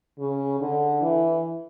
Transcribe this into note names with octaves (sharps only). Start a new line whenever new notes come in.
C#3
D3
E3